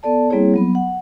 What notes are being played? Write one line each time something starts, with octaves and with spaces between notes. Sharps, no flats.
B3 A4 D5 A5
G3 A#3 C4 E4 G#4 C#5
F#3 B3 B5
F#5